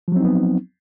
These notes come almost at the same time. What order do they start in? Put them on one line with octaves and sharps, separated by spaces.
F3 F#3 C4 D#4 B3